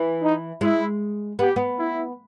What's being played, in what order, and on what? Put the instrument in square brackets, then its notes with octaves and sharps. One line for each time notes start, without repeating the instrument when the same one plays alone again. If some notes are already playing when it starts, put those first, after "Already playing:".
Already playing: [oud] E3
[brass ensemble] D#4
[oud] G#3 [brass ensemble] E4
[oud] B3 [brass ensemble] G4
[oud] B3
[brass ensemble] E4